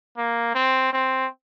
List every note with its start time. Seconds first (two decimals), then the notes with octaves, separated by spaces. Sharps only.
0.17 A#3
0.55 C4
0.93 C4